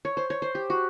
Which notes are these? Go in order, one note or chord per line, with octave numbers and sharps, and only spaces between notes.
C#5
C5
C#5
C5
G4
F#4